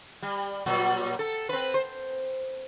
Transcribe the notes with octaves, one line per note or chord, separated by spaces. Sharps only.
G3
A#2 F#3 G3
A4
C4 B4
C5